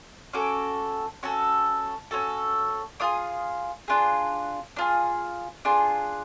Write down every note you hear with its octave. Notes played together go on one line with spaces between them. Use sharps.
C#4 F#4 A4 D6
C#4 F#4 A4
C#4 F#4 A4
D4 F4 G#4 D#6
D4 F4 G#4
D4 F4 G#4
D4 F4 G#4